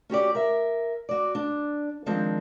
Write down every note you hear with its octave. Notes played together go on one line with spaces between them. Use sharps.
C#4 F#4 G4 D5
A#4 E5
F#4 D5
D4
D#3 F3 G#3 C4 D4